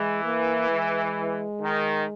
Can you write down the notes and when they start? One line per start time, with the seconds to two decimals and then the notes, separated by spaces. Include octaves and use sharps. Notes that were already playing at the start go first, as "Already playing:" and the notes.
Already playing: E3 G#3
0.24 A#3
0.70 G#3
1.62 D#3